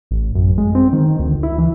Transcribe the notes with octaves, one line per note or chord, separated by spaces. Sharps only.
A1
F#2
G#3
C4
D#3
D2
E4
E3